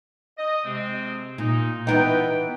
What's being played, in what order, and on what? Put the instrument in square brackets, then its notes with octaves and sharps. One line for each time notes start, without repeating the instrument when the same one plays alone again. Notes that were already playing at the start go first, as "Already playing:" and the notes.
[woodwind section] D#5
C3 G#3 C4
[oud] A#2 [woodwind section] D#4
[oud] E3 B3 D#4 [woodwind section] B4 G5